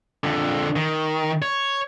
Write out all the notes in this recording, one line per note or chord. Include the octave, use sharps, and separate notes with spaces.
F2 D3
D#3
C#5